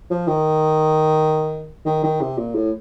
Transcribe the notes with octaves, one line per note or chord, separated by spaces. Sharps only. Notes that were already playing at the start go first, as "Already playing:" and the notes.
F3
D#3
D#3
D#3
C3
A#2
A2